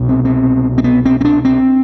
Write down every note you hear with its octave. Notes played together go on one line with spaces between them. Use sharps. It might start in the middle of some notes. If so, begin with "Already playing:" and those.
Already playing: C2 B2
C4
C4
C4
B3
C4
C4
D4
C4